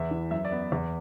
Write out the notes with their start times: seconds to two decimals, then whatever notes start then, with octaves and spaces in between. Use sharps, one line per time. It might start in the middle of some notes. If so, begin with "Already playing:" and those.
Already playing: E2 E5
0.11 E3
0.31 F#2 E5
0.45 D5
0.52 B3
0.72 E2